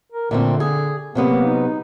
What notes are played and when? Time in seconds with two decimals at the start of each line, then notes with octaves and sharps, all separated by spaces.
0.12 A#4
0.31 A#2 D3 A3 C4
0.60 G#4
1.15 C3 F#3 A#3 B3
1.44 D#4